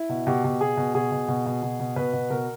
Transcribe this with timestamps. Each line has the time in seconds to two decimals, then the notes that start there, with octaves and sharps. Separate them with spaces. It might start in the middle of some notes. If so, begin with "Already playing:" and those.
Already playing: E4
0.09 B2
0.27 B2 G4
0.44 B2
0.61 B2 G#4
0.77 B2
0.94 B2 G#4
1.12 B2
1.28 B2
1.46 B2
1.63 B2
1.80 B2
1.96 B2 B4
2.13 B2
2.30 B2 A#4